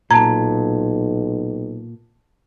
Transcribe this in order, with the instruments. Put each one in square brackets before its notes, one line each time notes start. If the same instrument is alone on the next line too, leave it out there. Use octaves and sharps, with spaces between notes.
[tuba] B1 [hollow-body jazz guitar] A#2 [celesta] A5 G#6 [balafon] A#5